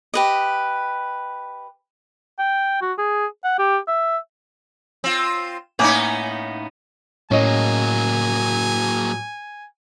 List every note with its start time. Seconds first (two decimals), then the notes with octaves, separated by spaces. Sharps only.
0.14 G4 B4 D#5
2.39 G5
2.82 F#4
2.98 G#4
3.44 F#5
3.59 G4
3.88 E5
5.04 C4 F4
5.79 A2 A#3 B3 C#4 D#4 G#5
7.31 A2 F#3 A#3 C#4 D#5 G#5